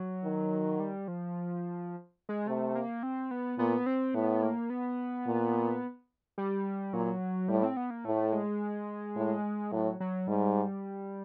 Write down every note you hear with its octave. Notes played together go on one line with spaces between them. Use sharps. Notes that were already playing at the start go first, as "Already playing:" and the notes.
Already playing: F#3
D#3
G3
F3
G#3
C3 A3
A#3
C4
B3
A#2 B3
C4
A2 B3
A#3
B3
A#2
G3
A#2 F#3
A2 G3
C4
B3
A#3
A2 A3
G#3
A2
A2 F#3
F#3
G#2 G3